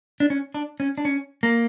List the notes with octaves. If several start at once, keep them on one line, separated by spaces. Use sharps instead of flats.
D4
C#4
D4
C#4
D4
C#4
A#3